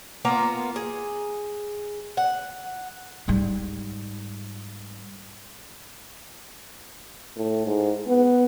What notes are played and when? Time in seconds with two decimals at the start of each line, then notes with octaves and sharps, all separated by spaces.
0.25 A#3 B3 F4 A#5
0.76 G#4
2.17 F#5
3.28 G#2 G3
7.37 A2
7.66 G#2
8.07 B3